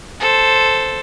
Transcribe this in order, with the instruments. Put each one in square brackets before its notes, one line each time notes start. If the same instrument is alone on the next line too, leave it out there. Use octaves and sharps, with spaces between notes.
[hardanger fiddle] A4 C5